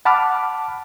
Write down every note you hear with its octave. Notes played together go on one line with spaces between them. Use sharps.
F#5 A5 B5 D6 F6